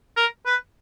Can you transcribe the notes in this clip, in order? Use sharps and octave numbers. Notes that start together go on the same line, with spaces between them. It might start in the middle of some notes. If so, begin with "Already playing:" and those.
A#4
B4